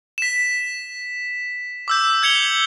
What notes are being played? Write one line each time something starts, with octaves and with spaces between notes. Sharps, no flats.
B6 E7
D6 E6 G6
G6 G#6 C#7 F7 G7